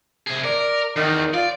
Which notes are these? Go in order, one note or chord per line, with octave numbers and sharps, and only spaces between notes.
C3 G#4
A#4 D5
E2 D#3
F4 D5